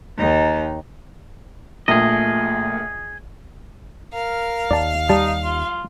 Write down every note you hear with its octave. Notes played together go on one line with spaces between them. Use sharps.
D#2 D#4
A#1 A#2 A3 G#4 D#5
A#4 F5
D#2 D5 A5
G3 D#4 A5
F4